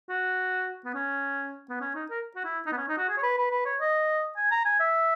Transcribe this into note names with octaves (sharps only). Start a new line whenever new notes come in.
F#4
B3
C#4
B3
C#4
D#4
A#4
F#4
E4
D#4
B3
C#4
D#4
F#4
G#4
C#5
B4
B4
B4
C#5
D#5
G#5
A#5
G#5
E5